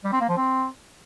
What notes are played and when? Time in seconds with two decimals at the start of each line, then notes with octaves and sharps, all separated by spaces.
0.04 G3
0.13 C4
0.21 A#3
0.29 F3
0.37 C4